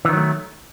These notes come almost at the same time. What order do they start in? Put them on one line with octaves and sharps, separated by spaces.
E3 D#3 F#3 A3